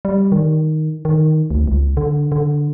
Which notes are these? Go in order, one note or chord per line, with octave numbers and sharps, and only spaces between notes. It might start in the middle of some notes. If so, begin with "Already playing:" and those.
G3
D#3
D#3
D2
C#2
D3
D3